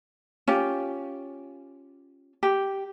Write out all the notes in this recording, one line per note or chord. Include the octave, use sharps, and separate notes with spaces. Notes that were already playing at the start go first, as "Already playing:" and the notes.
C#4 F4 G4
G4